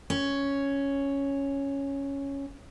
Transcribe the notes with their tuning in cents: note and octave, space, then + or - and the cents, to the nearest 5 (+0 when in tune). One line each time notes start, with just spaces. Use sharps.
C#4 +0